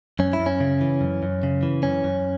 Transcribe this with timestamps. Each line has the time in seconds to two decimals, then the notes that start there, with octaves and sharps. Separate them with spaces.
0.19 F#2 C#4
0.33 E4
0.39 F#2
0.46 C#4
0.60 C#3
0.81 E3
1.01 F#2
1.23 F#2
1.43 C#3
1.63 E3
1.83 F#2 C#4
2.04 F#2